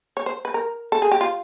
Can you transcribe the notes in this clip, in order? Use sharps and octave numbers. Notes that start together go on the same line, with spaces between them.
C#5
C5
B4
A#4
A4
G#4
G4
F4